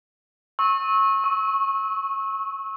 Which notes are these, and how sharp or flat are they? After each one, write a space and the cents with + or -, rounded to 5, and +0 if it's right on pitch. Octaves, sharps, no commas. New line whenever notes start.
C#6 -25 E6 -30
C#6 +0 E6 -15